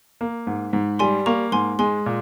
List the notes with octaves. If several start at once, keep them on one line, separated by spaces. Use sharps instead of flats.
A#3
G#2
G#2
G3 G#5 C6
A#3 A#5 C#6
G#2 G#5 C6
G#3 G#5 C6
A#2